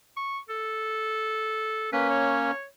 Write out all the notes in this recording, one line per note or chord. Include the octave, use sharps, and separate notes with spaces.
C#6
A4
A#3 C#4 B4
C#5